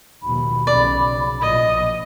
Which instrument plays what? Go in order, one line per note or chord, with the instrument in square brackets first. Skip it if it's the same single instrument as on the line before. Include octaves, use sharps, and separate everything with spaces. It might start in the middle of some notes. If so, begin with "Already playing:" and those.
[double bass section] D#2 B2 F3 [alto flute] B5
[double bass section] B1 C#3 [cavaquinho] D5
[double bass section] A#1 F3 [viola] D#5